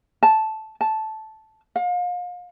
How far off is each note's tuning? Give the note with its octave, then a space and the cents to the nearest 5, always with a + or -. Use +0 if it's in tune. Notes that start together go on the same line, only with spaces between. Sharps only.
A5 -10
A5 -10
F5 +35